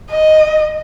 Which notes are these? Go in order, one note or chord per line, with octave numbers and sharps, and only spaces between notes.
D#5